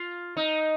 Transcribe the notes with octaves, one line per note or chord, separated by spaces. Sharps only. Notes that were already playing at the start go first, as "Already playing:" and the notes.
Already playing: F4
D#4